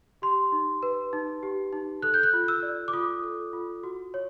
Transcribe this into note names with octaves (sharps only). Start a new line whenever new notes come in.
G4 C6
D#4
B4
D#4
G4
D#4
A4 F#6
G6
F#6
F4
E6
D5
D6
F4 D#6
A4
F4
F#4
C#5